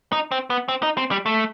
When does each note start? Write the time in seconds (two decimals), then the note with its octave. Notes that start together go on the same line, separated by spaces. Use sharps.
0.12 D#4
0.32 C4
0.50 B3
0.68 C4
0.83 D#4
0.97 C4
1.11 G3
1.26 A3